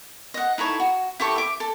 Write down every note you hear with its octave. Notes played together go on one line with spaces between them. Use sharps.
D#5 F#5
D#4 E4 A4 C#5
F#4
E4 G4 A4 C#6
E5 D6
A4